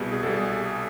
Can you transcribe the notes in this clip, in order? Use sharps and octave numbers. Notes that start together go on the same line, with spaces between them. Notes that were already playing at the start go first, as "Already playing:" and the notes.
Already playing: C2 B2 G3 G#4
G#4
C2 B2 G3 A4
G#4